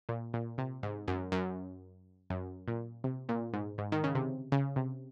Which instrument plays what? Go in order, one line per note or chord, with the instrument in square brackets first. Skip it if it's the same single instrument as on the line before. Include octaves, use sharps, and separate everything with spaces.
[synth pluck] A#2
A#2
C3
G#2
F#2
F#2
F#2
A#2
C3
A#2
G#2
G#2
D#3
C#3
C3
C#3
C3